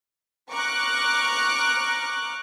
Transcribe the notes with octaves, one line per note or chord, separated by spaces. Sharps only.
A#5 C#6 D6 F6 F#6